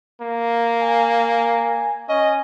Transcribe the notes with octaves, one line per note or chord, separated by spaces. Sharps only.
A#3
G#5
C#4 D#5